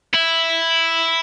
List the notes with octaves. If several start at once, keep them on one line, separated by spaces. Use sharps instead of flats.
E4